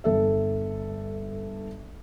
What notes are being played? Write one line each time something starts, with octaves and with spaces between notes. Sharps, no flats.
G1 A4 E5